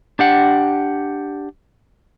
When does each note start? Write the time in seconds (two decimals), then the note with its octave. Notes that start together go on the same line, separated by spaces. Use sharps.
0.19 D4 G4 F#5